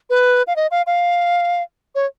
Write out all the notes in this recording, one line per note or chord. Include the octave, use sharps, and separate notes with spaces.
B4
F5
D#5
F5
F5
C#5